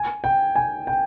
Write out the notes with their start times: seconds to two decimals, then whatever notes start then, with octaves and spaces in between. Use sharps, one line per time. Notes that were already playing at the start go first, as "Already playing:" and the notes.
Already playing: G#5
0.24 G5
0.56 G#5
0.87 G5